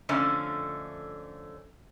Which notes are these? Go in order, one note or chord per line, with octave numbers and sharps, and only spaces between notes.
F2 D3 A3 C#4